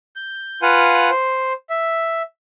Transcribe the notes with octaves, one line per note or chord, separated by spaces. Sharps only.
G6
F4 B4 F5 F#5 G#5
C5
E5